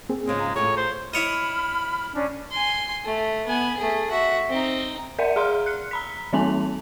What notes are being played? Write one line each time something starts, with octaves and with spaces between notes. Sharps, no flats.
A#3 C4 G#4
G#2 C#3 F3 G#3
A#5
A2 F4 G#4 C#5
C5
E4 C#5 D#5 B5 F6
C#4 D4 D5
G#5 C6
A3
B3 G#5
A3 G#4
F#4 E5
C4 D#4
A#4 D5 E5 F#5
G#4 F5 A#5 C6 F6
F#6 C#7
A#5 B5 B6
E3 G3 C4 D#4 G#5 F#7